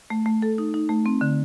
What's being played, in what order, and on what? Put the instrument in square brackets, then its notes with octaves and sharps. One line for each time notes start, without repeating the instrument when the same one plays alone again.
[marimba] A3
A3
A4
D#4
D#4
A3
C4
D3